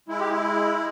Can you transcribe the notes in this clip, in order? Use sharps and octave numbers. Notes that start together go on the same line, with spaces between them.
G#3 E4
G4
E4